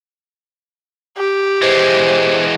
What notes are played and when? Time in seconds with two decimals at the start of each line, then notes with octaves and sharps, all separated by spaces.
1.17 G4
1.62 E3 G#3 C5